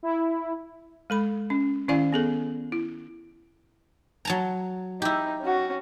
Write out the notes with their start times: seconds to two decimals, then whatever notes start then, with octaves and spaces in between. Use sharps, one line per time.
0.03 E4
1.10 G#3 A4 B5
1.50 C#4
1.88 D#3 C#4 E4 D5 F5 G#5
2.13 B3 G#4 A4
2.72 E4
4.25 F#3 A5 A#5
5.02 D#4 E4 G4
5.41 C#4 F#4